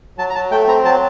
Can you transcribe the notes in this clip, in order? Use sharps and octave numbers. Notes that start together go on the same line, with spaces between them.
F#3 A5
A#5
F#3 A5
A3 G5
C4 A#5
F#3 A5